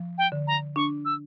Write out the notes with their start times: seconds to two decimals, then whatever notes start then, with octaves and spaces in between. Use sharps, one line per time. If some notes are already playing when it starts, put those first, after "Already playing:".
Already playing: F3
0.18 G5
0.32 D3
0.47 A#5
0.76 D4 C#6
1.05 E6